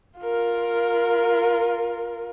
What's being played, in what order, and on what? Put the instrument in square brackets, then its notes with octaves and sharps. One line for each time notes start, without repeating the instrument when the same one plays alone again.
[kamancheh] F4 A#4